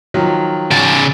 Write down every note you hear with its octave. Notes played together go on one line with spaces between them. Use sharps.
D#3 F3 F#3
C#3 D5